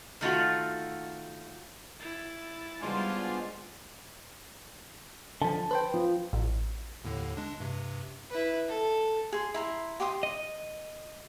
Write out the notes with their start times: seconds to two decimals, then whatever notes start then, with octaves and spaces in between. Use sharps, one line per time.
0.21 D#3 A3 F4 F#4
2.00 E4 A6
2.81 C#3 G3 G#3 B3 D4 F4 C5 G#5
5.42 D3 F3 A5
5.71 B4 C5 G5
5.94 F3
6.33 A1
7.04 D#2 A2 D3
7.37 G#3 D4
7.60 G2 C3
8.30 E4 B4
8.68 A4
9.32 G#4 C6
9.54 E4 A#5 C6
10.00 G4 G5 C6 D#6
10.23 D#5